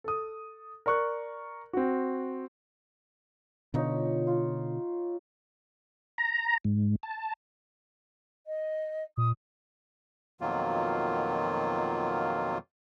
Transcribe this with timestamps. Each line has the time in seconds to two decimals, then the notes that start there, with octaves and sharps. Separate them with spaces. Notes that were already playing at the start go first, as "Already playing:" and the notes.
0.04 A4 D#6
0.86 A#4 D5 C#6 F#6
1.73 C4 F#4
3.74 B2 D3 F3 D#4 C#5
4.27 F4
6.18 A#5
6.65 G#2
7.03 A5
8.47 D#5
9.17 A#2 D#6
10.41 F2 B2 D#3 F#3 A#3 F4